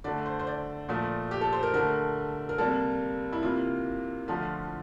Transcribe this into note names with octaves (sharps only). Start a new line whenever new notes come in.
D3 A3 D5
C5
C5
D5
A#2 F3 A3
G4
A4
C5
A#4
D3 A3 A#4
A#4
C3 G3 A#3 A4
E4
C3 E3 A#3 F4
D3 F3 A3 F4